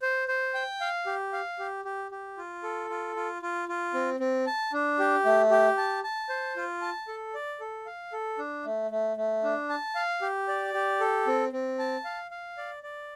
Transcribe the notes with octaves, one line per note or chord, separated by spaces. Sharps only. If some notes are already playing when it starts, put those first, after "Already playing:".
C5
C5
G5
F5
G4
F5
G4
G4
G4
F4
A4
F4
F4
F4
F4
C4
C4
A5
D4
G4
A3
G4
A5
A5
C5
F4
A5
A4
D5
A4
F5
A4
D4
A3
A3
A3
D4
A5
F5
G4
D5
G4
A4
C4
C4
A5
F5
F5
D5
D5